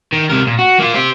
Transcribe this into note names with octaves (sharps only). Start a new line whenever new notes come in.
D#3
C3 A#4
A#2
F#4
A#3 F4
G4 C5